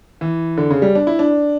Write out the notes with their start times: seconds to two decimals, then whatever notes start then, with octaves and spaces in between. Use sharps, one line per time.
0.21 E3
0.57 D3
0.70 C#3
0.82 G3
0.95 D4
1.07 E4
1.19 D4